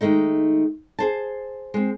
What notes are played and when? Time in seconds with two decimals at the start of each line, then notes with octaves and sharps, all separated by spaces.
0.01 D#3 E3 G#3 A3 D#4
0.99 G#4 C5 A5
1.74 G#3 C4